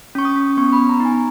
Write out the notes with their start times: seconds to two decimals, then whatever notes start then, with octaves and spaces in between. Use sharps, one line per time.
0.15 C#4 C#6
0.25 D#6
0.36 C#4
0.57 B3 C#6
0.73 B5
0.78 B3
0.89 A#5
1.00 D#4 G#5